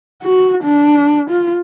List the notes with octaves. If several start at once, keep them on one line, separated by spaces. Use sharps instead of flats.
F#4
D4
F4